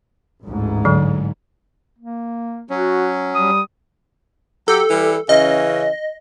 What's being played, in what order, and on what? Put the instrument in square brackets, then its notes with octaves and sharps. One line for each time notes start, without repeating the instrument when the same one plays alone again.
[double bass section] A1 D2 G#2
[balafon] D3 F#3 G#3
[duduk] A#3
[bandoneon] F#3 C#4 [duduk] F#4
[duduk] G3 [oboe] D#6
[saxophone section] F#3 G4 [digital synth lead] A4
[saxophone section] E3 G3
[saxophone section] C#3 E3 C#4 [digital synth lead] D#5